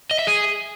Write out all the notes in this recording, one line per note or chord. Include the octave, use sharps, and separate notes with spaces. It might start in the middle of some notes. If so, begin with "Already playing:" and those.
D#5
E5
G#4